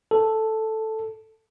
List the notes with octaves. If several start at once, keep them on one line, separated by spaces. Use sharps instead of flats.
A4